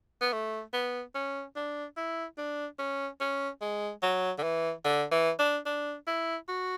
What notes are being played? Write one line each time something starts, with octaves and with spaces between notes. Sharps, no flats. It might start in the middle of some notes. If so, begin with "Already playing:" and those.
B3
A3
B3
C#4
D4
E4
D4
C#4
C#4
G#3
F#3
D3
E3
D3
E3
D4
D4
E4
F#4